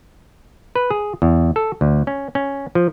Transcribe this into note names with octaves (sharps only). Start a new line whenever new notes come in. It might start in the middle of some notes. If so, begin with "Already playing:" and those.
B4
G#4
E2
A4
D2
C#4
C#4
F3